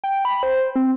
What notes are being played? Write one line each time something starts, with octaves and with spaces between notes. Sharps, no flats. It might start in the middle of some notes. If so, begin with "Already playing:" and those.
G5
B5
C5
C4